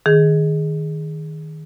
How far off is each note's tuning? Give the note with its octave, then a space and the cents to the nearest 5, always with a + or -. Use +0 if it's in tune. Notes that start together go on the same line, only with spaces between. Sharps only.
D#3 +0 G#4 +0